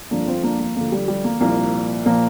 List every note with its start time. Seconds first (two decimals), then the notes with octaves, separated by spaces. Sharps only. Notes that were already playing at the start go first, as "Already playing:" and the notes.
0.11 G1 F2 F3 A#3 D4
0.27 C4 F4
0.43 A#3 D4
0.60 A#3
0.76 D2 D3 F3 A#3
0.92 G3
1.08 G3
1.24 A#3
1.40 C2 A#2 F3 A#3
2.06 A#2 F3 A#3